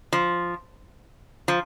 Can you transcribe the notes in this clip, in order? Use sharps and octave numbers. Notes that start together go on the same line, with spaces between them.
F3
F3